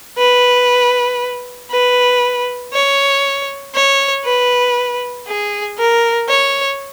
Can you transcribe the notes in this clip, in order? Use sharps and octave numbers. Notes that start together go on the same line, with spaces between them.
B4
B4
C#5
C#5
B4
G#4
A#4
C#5